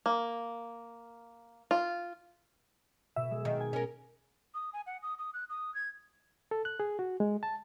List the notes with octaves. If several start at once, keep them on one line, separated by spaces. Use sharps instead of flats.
A#3
F4
B2 E5
G#3
D#3
G#5
C#4 A#4
D#6
G#5
F#5
D#6
D#6
F#6
D#6
G#6
A4
F#6
G#4
F#4
G#3
A5